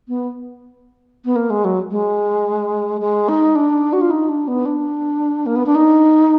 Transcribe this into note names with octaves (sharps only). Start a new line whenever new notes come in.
B3
B3
A#3
G#3
F#3
G#3
G#3
D#4
D4
F#4
F4
D#4
D4
B3
D4
A#3
B3
D4
D#4